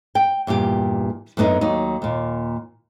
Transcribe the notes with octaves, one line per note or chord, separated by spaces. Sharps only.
G5
E2 G2 A#2 G4
F#2 D3 B3 C#4 D#4
D#2 F#3 D#4
D#2 A#2